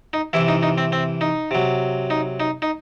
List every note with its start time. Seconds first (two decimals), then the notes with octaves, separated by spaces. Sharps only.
0.13 D#4
0.33 C3 E3 E4
0.48 D#4
0.63 D#4
0.78 C4
0.92 C4
1.21 D#4
1.51 C3 F#3
2.10 D#4
2.40 D#4
2.62 D#4